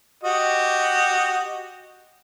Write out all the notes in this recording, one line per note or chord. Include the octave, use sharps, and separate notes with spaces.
F#4 G4 D#5